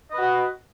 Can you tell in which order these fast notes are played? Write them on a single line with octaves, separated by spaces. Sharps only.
D#5 B4 F#4